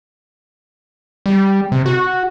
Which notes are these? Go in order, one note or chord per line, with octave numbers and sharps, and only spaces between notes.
G3
C3
F#4